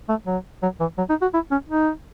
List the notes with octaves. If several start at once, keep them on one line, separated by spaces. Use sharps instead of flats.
A3
F#3
F#3
E3
F#3
D#4
F#4
E4
C#4
D#4